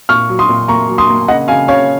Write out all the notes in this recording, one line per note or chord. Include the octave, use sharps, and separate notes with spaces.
A#2 C#6 F6
F#3
C6 D#6
A#2
A#3 A#5 C#6
F#3
C6 D#6
A#3
C#3 D#5 F#5
C#3 F5 G#5
C#3 C#5 F5